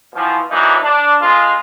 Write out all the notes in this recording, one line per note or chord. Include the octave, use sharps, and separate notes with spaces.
B2 E3 F3
E3 F#3 A#3 D4 D#4
D4
F2 G#3 F4